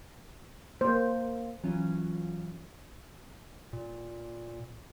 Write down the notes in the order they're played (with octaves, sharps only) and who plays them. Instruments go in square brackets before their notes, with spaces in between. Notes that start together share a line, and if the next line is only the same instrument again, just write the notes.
[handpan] A#3 [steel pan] C5
[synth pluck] E3 F#3 C#4 F4
[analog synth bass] A#2